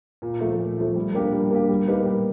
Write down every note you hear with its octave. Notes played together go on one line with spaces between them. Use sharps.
A#2
F3 A3
A#2
F3 A3
G3
A#3 D4 G4
G3
A#3 D4 G4
G3
A#3 D#4 G4 B4
G3